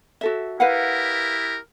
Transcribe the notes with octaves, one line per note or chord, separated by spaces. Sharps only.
F#4 A4 E5
E4 G4 A#4 B4 F5 F#5